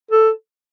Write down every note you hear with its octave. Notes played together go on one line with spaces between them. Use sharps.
A4